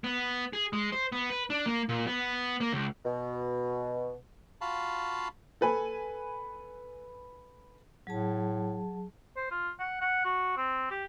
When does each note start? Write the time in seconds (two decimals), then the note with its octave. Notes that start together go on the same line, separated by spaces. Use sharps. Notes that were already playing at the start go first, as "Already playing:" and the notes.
0.04 B3
0.53 G#4
0.73 G#3
0.92 C5
1.12 B3
1.30 B4
1.50 D4
1.66 A#3
1.89 A#2
2.07 B3
2.60 A#3
2.73 C#2
3.05 B2
4.61 F4 F#4 F5 A5 B5
5.61 A4 B4 G#5
8.07 A2 F#3 G#4 A5
9.36 C5
9.51 F4
9.79 F#5
10.01 F#5
10.25 F#4
10.57 C4
10.90 G4